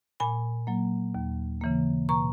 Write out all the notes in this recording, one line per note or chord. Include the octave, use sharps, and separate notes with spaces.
A#2 G#5 B5
F#3 A#3
D#2
C#3 E3 A#3
B2 A#5 C#6